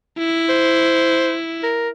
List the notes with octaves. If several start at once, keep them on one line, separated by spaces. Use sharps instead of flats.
E4
C5
A#4